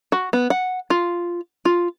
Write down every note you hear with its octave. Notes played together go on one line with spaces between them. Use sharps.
F#4
B3
F#5
F4
F4